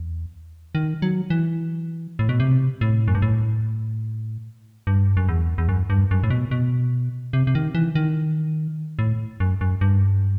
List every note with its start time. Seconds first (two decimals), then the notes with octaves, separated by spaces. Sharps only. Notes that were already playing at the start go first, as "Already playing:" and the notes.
Already playing: E2
0.75 D#3
1.02 F#3
1.30 E3
2.19 A2
2.29 B2
2.40 C3
2.81 A2
3.08 F#2
3.15 G2
3.22 A2
4.87 G2
5.17 F#2
5.29 E2
5.58 E2
5.69 F#2
5.90 G2
6.11 F#2
6.24 A2
6.30 B2
6.51 B2
7.33 C3
7.47 C3
7.55 D#3
7.75 E3
7.95 D#3
8.99 A2
9.40 F#2
9.61 F#2
9.81 G2